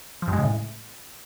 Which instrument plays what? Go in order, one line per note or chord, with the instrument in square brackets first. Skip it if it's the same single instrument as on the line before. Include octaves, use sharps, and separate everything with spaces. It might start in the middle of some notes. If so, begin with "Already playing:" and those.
[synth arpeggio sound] F3
G2
G#3
C#3
A2